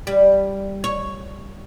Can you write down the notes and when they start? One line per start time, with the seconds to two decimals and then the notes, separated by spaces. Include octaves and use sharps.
0.07 G3
0.84 C#5